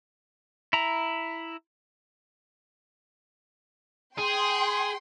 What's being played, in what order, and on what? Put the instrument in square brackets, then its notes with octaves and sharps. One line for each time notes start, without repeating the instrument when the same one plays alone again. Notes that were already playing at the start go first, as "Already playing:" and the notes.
[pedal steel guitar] E4 A#5
[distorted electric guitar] G#4 [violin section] G5 C6